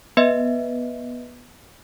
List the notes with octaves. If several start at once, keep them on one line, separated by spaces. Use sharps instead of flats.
B3 B4 D#5 E5